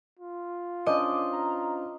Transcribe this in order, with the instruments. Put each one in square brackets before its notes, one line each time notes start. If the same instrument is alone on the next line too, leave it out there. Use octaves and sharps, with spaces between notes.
[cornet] F4
[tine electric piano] C#4 D4 C5 [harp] D#5 [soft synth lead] D6
[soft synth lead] A#5